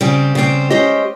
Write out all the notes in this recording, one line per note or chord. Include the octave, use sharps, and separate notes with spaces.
C#3 G3 C4 G4
C#3 G3 C4 G4
G#3 C#4 G4 C5 D#5